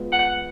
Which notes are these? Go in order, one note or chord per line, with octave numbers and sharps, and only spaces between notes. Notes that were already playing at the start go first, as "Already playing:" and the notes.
Already playing: G#3 B3 F4
F#5